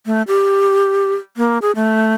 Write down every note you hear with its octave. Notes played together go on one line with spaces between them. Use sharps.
A3
G4
A#3
G#4
A3